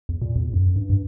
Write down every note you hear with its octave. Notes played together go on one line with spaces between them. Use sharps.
E2
A#2
E2
F#2
G2
G2